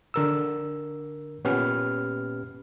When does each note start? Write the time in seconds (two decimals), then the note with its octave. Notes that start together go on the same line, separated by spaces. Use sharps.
0.14 D3 A#4 E6
1.44 A#2 B3 C#4 G4 B4 F6